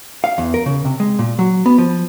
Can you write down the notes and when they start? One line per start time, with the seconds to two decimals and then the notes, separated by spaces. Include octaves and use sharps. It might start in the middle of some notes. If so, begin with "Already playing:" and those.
0.24 F5
0.38 E2
0.54 A#4
0.66 C#3
0.85 C3
1.00 G#3
1.19 A#2
1.39 F#3
1.66 B3
1.78 F3